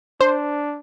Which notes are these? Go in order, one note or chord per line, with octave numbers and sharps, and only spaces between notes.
D4 C5